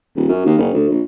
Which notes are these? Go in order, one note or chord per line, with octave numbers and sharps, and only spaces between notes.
D#1
F#2
D#2
F#1
D2
A#1